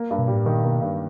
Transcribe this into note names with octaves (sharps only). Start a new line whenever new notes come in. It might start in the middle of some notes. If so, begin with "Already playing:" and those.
Already playing: A#3
G2
B2
A2 G3
A#2 D#3
B2 A#3
G2